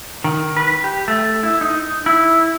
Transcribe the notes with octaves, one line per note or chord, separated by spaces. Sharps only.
D#3
B4
G4
A3
E4
D#4
E4